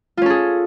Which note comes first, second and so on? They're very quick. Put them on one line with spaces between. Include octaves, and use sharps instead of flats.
F4 C#4 A4 G#4